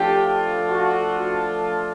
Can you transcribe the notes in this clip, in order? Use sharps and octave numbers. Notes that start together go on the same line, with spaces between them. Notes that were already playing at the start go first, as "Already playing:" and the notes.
Already playing: F3 A3 D4 F4 G4 A4
F#4